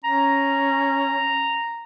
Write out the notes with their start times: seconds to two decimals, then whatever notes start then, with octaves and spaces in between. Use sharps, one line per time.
0.04 C#4 A#5